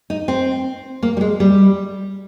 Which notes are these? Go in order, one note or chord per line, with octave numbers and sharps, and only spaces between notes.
D#4
C4
A#3
G3
G#3
G3